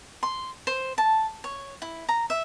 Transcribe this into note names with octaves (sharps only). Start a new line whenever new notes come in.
C6
C5
A5
C#5
E4
A#5
E5